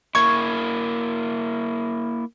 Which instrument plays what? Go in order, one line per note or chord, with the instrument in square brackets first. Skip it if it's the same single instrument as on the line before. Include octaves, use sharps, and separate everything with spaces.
[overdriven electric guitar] A#3 E4 [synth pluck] C#6 G#6